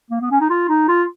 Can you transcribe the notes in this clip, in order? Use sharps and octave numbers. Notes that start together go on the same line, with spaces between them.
A#3
B3
C#4
D#4
F4
D#4
F4